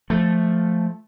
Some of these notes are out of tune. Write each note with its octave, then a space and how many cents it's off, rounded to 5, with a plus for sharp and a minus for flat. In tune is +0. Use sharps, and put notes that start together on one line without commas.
F3 +0 A3 +0